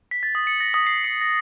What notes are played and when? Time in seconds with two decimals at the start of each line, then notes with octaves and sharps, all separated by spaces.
0.11 B6
0.23 A6
0.35 D#6
0.47 C#7
0.60 A#6
0.74 D#6
0.87 C7
1.04 C#7
1.21 A#6